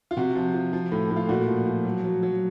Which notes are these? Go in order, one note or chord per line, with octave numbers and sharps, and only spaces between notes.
F4
C3 F#4
F3
F3
F3
A2
A2
F4
A#2 F#4
F3
F3
F#3
F#3
F#3